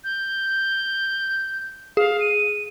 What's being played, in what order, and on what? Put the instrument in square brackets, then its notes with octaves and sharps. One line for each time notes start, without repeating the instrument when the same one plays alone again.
[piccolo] G6
[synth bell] G#4 [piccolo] F5
[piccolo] D#7